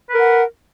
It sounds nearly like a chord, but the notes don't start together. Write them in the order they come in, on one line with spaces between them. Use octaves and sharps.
B4 A#4 F#5